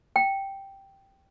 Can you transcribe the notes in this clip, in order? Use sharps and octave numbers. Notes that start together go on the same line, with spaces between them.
G5